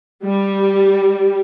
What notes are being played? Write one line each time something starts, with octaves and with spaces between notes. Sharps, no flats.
G3